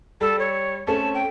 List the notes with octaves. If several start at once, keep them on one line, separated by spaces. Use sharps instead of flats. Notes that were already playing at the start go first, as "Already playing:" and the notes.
G3 A4
C#5
A3 C4 C#4 A5
G5